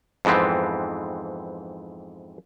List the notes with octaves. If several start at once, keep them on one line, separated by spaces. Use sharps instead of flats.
F2 G#2 E3 B3 C4